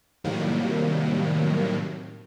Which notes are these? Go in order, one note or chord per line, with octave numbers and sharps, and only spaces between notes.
A2 C3 D#3 F#3 G3 A#3